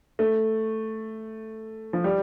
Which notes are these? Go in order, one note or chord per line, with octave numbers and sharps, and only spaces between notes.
A3
F3
G3